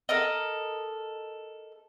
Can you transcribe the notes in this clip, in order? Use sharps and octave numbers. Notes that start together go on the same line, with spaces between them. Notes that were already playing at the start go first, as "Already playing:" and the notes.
A4 A#4 D#5